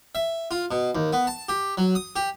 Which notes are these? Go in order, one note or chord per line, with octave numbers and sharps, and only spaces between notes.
E5
F4
B2
D#2
B3
A5
G4
F#3
D#6
G4